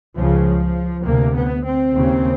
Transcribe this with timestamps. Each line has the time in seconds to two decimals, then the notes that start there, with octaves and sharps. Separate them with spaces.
0.16 C#2 C#3 F3
1.04 D2 C3 A#3
1.35 B3
1.64 C4
1.94 D#2 C#3